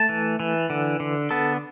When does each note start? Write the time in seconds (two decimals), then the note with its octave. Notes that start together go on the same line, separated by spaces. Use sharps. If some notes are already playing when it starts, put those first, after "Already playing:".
Already playing: A3 A5
0.09 E3
0.40 E3
0.70 D3
1.00 D3
1.31 B3 A4